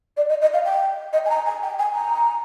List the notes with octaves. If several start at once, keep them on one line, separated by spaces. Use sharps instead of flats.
D5
D#5
D#5
F5
G5
D#5
G#5
A#5
G#5
G5
G#5
A#5